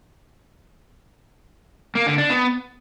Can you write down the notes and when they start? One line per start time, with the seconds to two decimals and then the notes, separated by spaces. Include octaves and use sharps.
1.95 A#3
2.07 D3
2.18 D4
2.30 B3